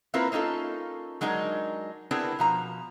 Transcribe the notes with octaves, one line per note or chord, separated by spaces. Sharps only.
A#3 C4 E4 F4 A#4 B4
A#3 C#4 D#4 F4 A4
F#3 G#3 D4 D#4 A#4
B3 C4 D4 E4 G#4 A#4
B2 F3 A#5